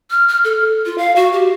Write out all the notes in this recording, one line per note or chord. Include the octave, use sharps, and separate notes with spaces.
F6
F6
A4
F4
F5
F#4
G4